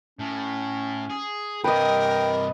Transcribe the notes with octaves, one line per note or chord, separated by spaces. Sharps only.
A2 C#4
G#4
G2 C3 A#4 B4 D#5 G5